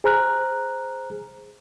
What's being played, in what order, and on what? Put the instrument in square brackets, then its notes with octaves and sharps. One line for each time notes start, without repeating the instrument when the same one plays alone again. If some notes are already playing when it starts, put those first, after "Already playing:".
[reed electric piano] G#4 C5 A#5 F6 F#6